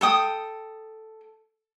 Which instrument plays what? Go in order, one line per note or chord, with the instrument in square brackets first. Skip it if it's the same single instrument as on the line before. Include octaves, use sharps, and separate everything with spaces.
[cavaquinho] A4 G5 D#6